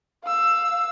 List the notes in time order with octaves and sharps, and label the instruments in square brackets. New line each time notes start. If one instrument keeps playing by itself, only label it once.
[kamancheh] F5 E6